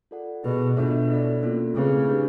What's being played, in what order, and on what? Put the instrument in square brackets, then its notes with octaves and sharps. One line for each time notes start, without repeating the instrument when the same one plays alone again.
[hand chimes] F4 A4 D5 F#5
[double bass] B2 [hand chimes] E4 G#4 B4
[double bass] B2 [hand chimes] D4 F4 A4 C#5 E5
[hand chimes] E4 A4 D5
A#3 C#4 F4 A4
[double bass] C#3 [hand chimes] A3 C4 E4 G#4 B4
[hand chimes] D4 G4 B4